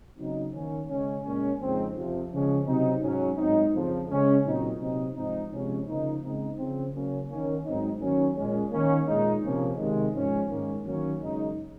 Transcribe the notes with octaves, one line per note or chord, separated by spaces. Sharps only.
C#3 F#3 C4 D#4
D#3 A#3 C#4
C#3 G#3 C#4
A#2 G#3 C#4
F2 C#3 G#3 C4 D#4
F2 C3 F3
C#3 F3 G#3 C#4
C3 F#3 C4 D#4
G#2 F#3 C#4
G#2 F#3 C4 D#4
F2 C#3 F3
C#3 G#3 C#4
A#2 F#3 C4 D#4
C3 F#3 C4 D#4
G#2 F3 C4 D#4
C3 F3 G#3 C#4
C#3 F3 A#3 D#4
C#3 G#3 C4 D#4
C#3 F3 C4
C#3 F#3 A#3 C#4
D#3 A#3 C#4
G#2 F#3 C4 D#4
D#3 F#3 A#3 C#4
A#2 G#3 C#4
D#3 A#3 C#4
A#2 G#3 D#4
C3 F3 A#3 C#4
C3 D#3 G#3
G#2 F3 G#3 C#4
G#2 D#3 A#3 C#4
D#3 F#3 A#3 C#4
F#2 C#3 G#3 D#4